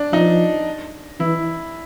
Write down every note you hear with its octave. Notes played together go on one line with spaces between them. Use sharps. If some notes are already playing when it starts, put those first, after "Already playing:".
Already playing: D4
F3 D#4
E3 E4